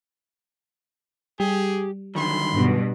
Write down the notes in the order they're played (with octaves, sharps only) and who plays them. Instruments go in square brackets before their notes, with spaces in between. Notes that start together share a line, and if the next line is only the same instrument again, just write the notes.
[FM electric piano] G3 [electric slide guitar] G4 [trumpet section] G#4
[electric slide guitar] D3 D#3 F#3 [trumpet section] B5 C6
[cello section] G2 B2